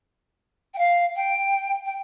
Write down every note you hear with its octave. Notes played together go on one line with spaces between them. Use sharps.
G5
F5
G5
G5